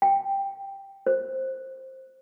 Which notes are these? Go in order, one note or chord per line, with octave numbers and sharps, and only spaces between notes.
G5
C5